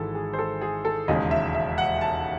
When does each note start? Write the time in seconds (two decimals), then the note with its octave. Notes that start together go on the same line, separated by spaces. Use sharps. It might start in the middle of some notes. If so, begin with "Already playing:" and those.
Already playing: G#1 G#2 E3 G#3 A4
0.15 G#4
0.33 C5
0.39 A4
0.61 G#4
0.85 A4
1.08 E1 D#2 C#3 G#3 D#5
1.31 E5
1.55 E5
1.78 F#5
2.01 A5